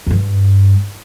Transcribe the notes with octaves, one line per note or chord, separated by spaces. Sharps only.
F2
G2